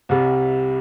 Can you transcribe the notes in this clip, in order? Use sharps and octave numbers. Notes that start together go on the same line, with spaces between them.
C2 C3 G3